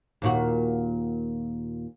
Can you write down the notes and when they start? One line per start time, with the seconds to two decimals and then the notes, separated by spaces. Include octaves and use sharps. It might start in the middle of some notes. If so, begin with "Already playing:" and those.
0.22 D#2 A#2 F#4